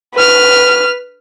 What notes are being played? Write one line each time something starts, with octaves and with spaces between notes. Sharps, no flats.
B4 F6